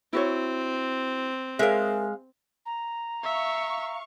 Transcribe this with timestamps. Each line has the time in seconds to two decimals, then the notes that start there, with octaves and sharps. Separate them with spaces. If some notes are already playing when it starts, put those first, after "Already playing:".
0.13 C4 E4 F#4 C#5
1.59 G#3 G#4 A#4 C#5 E5 F5
2.65 A#5
3.24 E5 F5 C#6